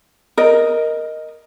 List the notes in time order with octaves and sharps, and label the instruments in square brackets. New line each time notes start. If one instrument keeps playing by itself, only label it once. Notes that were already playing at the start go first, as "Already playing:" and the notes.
[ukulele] A#4 D#5